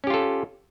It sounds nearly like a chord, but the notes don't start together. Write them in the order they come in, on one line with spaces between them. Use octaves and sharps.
C#4 G4 F4 A4